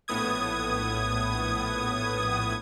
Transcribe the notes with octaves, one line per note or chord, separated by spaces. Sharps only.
A#1 A2 B3 D#6 G#6